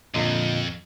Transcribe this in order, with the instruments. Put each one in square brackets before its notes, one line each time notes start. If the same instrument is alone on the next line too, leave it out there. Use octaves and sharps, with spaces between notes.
[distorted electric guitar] F2 [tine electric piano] A#2 D3 D#5